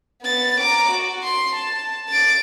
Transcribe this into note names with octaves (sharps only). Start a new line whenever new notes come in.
B3 A6
A#5 D6
F#4
C6
A5
A6 D7